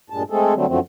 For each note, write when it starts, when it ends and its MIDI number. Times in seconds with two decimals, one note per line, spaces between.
0.10 0.23 43
0.10 0.23 46
0.10 0.23 56
0.10 0.23 81
0.30 0.54 56
0.30 0.54 57
0.30 0.54 60
0.30 0.54 68
0.30 0.54 69
0.54 0.66 50
0.54 0.66 54
0.54 0.66 55
0.54 0.66 57
0.54 0.66 60
0.67 0.79 42
0.67 0.79 50
0.67 0.79 53
0.67 0.79 54
0.67 0.79 57
0.67 0.79 60